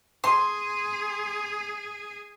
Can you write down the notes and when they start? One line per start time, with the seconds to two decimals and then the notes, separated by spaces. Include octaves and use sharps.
0.24 G#4 C6